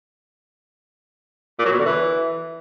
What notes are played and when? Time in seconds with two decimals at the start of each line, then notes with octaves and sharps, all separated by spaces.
1.59 A#2
1.66 F#3
1.72 B2
1.79 D3
1.85 E3